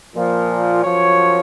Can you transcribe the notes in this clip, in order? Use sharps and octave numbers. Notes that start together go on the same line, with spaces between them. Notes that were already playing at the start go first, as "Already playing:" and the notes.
A#2 F3
F#2 F3 C#5